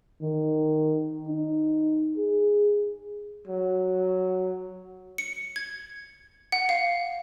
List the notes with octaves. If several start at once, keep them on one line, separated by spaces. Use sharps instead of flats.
D#3
D#4
G#4
F#3
C#7
G#6
F#5
F5